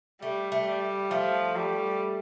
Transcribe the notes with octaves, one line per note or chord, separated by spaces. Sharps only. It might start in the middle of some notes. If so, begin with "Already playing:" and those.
G3 A3
A3
G3
F3 A3
G3